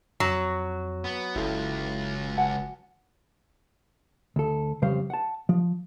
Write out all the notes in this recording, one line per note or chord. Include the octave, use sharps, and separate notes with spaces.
F2 F#3
B3
F#1 C#2 E4 F4 A4
F#5 G#5 A5
D2 A4
F2 C#3 G3 C5 F5
F#5 A5
F3